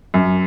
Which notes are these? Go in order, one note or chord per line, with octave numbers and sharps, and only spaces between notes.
F#2